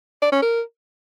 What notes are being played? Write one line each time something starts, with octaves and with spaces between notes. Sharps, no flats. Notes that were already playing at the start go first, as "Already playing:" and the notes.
D5
C#4
A#4